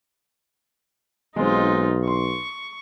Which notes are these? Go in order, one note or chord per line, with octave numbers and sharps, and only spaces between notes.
B1 G#3 C4 D#4 F4
C6 C#6